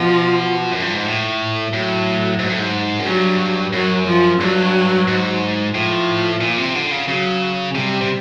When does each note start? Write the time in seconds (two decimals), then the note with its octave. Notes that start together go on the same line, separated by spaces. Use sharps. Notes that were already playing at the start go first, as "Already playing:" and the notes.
Already playing: B2 F3
0.71 F#2
0.82 G2
0.95 G#2
1.06 A2
1.73 A2 F#3
2.39 G#2
2.49 A2
2.59 G#2
2.99 F#2
3.06 G2 F#3
3.73 F#2 F#3
4.07 F3
4.41 G2 F#3
5.08 G#2
5.74 A2 F3
6.41 A#2
6.58 C3
6.75 D3
6.91 C#3
7.07 C#3 F#3
7.75 C3 G3
8.01 C3